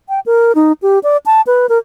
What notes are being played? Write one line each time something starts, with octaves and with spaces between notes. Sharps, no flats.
G5
A#4
D#4
G4
D5
A5
B4
A#4